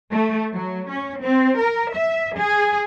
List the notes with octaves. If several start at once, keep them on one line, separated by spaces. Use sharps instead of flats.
A3
F#3
C#4
C4
A#4
E5
G#4